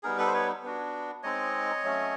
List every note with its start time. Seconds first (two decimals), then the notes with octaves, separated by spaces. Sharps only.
0.03 G3 B3 D#4 G#4 A#4
0.18 A4 B4
0.27 C5
0.34 B4 C#5
0.63 B3 D4 F#4
1.23 G#3 C4 D#4 C#5 D#5
1.84 F#3 A3 C#4